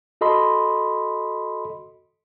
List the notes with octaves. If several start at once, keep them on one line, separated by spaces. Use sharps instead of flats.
F#4 A4 D#5 B5 C6